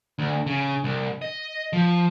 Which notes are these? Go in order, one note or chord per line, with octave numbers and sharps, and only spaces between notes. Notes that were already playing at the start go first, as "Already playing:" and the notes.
D2
C#3
C2
D#5
F3